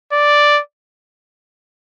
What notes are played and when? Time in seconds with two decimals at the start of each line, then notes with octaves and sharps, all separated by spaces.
0.13 D5